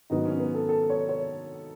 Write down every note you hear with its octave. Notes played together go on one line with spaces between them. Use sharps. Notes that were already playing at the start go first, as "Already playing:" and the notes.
G#2 D#3 F#3 B3 D#4
C#4
B3
A4
A4
C#5
C#5